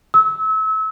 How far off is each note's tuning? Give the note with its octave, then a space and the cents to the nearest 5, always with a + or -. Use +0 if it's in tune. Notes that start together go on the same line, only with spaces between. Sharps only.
E6 -30